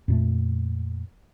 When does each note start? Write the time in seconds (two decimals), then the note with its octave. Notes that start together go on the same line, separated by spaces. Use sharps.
0.08 F2 A#2 A3